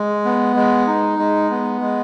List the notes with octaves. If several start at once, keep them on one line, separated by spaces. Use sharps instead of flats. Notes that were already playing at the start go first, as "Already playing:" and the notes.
Already playing: G#3
B3
G#3
D#4
G#3
B3
G#3